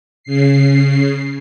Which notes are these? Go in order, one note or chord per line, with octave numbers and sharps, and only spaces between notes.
C#3 C7